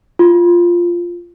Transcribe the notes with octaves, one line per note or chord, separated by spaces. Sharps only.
F4